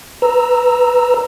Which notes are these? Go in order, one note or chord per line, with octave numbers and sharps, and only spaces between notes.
B4 A#5 E6